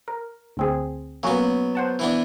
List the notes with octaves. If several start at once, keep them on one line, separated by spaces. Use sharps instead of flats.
A#4
D2 C4 G#4
F#3 A#3 B3 C#4 F#4
C5 F#5 A5
E3 B3 D4